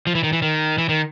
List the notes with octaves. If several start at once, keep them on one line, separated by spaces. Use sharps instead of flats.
F3
E3
D#3
E3
D#3
E3
D#3